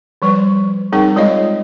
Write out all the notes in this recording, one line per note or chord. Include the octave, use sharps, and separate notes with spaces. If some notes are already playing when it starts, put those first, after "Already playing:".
F3 G3 B4 D5
G3 C4 D#4 G#4 A#4
G#3 F4 C#5 D#5 F5